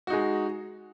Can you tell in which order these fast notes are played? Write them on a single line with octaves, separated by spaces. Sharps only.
F#4 D#4 G#3